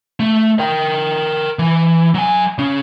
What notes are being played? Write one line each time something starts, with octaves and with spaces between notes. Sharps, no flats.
A3
A#4 G5
E3
F#3 G#5
C#3 C#4